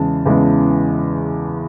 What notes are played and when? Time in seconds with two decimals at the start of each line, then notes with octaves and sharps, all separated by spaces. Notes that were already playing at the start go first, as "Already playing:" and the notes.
Already playing: E2 C#3 E3 G#3 A5
0.26 E2 C#3 E3 G#3